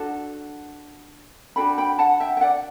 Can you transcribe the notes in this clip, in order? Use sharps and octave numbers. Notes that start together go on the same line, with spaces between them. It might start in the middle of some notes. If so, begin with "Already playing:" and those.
Already playing: D4 F#4 A4 F#5 A5
D4 F#4 A4 G5 B5
G5 B5
F#5 A5
E5 G5
G5
D5 F#5